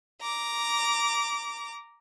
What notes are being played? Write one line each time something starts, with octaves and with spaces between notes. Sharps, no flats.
A#5 D6